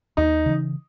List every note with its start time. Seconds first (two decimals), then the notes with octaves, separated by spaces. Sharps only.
0.17 D#2 D#4
0.46 C#3 E3